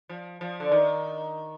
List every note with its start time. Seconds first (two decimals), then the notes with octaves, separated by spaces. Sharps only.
0.09 F3
0.41 F3
0.60 D3
0.72 D#3